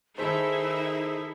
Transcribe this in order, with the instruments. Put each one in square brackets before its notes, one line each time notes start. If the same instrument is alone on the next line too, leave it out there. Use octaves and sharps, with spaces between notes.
[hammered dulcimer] D#3 A4 [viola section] D#4 E4 E5 [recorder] G#4 [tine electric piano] C5 B6